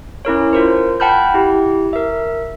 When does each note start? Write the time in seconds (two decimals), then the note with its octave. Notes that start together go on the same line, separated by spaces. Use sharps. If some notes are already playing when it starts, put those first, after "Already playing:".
0.25 C#4 E4 A#4 C#5
0.53 F4 A#4 C5
1.00 F#5 G5 A5 B5 F6 G6
1.34 E4 G4
1.93 A#4 E5